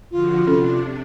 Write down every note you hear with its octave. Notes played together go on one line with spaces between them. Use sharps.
D3 F3 F4 F#4
C3 C#4 D4 A4